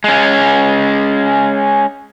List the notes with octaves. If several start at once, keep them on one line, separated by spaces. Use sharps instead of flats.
G#3 C#4